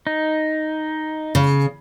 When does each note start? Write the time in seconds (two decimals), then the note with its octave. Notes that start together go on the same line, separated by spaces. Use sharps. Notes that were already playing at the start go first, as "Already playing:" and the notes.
0.07 D#4
1.35 C#3